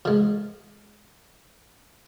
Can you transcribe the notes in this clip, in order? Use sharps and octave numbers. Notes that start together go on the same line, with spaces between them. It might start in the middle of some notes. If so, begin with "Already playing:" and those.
F3 G#3